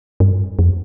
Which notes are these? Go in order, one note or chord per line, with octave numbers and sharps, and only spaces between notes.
G2
F2